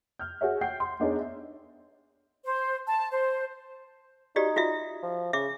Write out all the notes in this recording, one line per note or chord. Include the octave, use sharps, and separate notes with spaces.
F6 G6
F#4 G#4 C#5 E5
F#5 G5 G6 C7
C6
B3 D4 D#4 G#4 C#5
E5
C5
A5
C5
D#4 F#4 G4 D5
F4 F#4 E5
F3
C#3 E5 D6